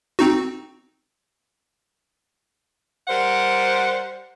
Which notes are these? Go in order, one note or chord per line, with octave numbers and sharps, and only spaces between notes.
C4 D#4 F#4
G3 A#4 C5 F#5